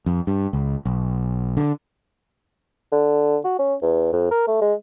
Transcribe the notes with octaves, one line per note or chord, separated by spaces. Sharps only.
F2
G2
C#2
B1
D3
D3
F#4
C#4
E2
F2
A#4
A3
G#3